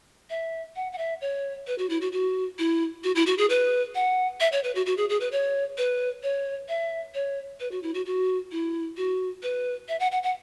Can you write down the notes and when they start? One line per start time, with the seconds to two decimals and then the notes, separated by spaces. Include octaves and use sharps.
0.30 E5
0.76 F#5
0.92 F#5
0.98 E5
1.21 C#5
1.67 B4
1.78 F#4
1.90 E4
2.01 F#4
2.12 F#4
2.59 E4
3.04 F#4
3.15 E4
3.26 F#4
3.38 G#4
3.50 B4
3.95 F#5
4.40 E5
4.52 C#5
4.64 B4
4.75 F#4
4.86 F#4
4.97 G#4
5.09 G#4
5.20 B4
5.32 C#5
5.78 B4
6.23 C#5
6.69 E5
7.15 C#5
7.60 B4
7.71 F#4
7.83 E4
7.94 F#4
8.06 F#4
8.52 E4
8.97 F#4
9.43 B4
9.89 E5
10.00 F#5
10.12 F#5
10.23 F#5